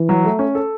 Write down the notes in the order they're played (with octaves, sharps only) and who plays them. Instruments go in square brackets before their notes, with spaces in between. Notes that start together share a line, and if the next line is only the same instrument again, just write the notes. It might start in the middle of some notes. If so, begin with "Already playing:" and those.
Already playing: [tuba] E3
[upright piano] F#3
A3
C#4
A4